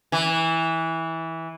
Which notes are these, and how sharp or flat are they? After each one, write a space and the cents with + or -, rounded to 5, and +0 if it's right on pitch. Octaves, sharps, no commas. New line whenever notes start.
E3 -15